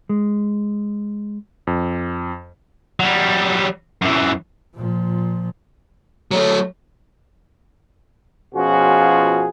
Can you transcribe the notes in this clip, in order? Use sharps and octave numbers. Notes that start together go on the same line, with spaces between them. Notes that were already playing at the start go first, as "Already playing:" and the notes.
G#3
F2
F#3 G3
F#2 E3
A#2 F3
F#3 A3 F#4 C#5 D5
B2 F3 C#4 F4 F#4 G#4